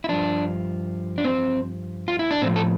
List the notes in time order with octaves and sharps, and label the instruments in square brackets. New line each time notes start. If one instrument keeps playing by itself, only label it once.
[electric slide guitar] E4
G2 F3 D4
D4
C4
F4
E4
D4
A2 C4
F3
A4